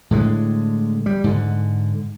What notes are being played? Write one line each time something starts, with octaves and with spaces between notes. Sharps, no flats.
A2 D3 G#3
G3
G#2 D3